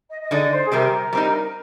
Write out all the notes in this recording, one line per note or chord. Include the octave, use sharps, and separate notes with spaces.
D#5
D#5
D3 G#3 D#4 D5
C5
G#4
C3 G3 C4 G4 A#4
G3 C4 D#4